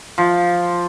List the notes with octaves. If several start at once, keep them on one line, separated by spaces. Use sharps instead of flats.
F3